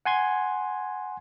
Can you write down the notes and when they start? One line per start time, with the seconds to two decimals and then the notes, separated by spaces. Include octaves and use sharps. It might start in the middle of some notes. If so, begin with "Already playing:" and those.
0.05 F#5 G#5 C6 G#6